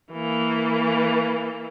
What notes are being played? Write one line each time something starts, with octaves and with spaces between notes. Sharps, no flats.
E3 A#3